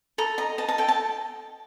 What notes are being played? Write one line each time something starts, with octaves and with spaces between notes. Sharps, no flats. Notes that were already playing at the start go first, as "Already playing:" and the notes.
A4 A#5
D#5 A#5
D#5 A5
A5
A4 G5
A5